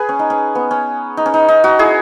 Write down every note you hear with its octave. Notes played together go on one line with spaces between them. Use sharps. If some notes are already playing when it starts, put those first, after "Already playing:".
Already playing: G#4 B4
C#4
D#4
C#4
B3
C#4
D#4
C#4
D#4
D#4
D#4 F#4
E4 G#4